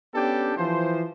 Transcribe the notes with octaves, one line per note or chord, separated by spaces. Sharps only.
B3 C#4 D4 G4 A4 G5
E3 F3 C5